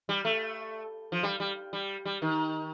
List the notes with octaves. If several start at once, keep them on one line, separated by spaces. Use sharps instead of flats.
G3
A3
F3
G3
G3
G3
G3
D#3